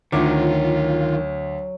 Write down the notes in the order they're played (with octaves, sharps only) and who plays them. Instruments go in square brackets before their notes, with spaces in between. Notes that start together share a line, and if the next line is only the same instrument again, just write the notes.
[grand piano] D2 C#5 D6 [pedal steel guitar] D#3 [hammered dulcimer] F#3 [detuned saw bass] F4